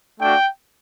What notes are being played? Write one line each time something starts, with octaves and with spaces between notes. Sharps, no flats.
A3 D4 F#4 G5